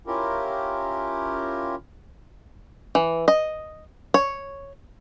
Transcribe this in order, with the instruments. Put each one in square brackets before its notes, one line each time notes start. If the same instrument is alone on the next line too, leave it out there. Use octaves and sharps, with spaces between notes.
[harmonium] C#4 E4 F4 G4 A#4
[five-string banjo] E3
D#5
C#5